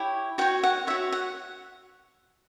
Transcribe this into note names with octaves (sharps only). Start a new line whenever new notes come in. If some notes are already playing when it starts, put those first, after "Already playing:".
Already playing: E4 G4 C#5
F#4 C#5 G5
F#5
F#4 C#5 E5
F#5